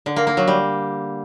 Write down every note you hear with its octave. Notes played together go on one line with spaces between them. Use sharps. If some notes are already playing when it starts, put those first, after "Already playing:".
D3
A#3
A#3
F#3
G3